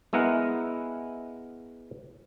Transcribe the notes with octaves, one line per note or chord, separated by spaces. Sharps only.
G#3 B3 E4 A#4 F#5